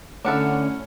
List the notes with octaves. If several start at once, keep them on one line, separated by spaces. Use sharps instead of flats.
D3 A3 C#4 D4 E4 A4 F#5 F6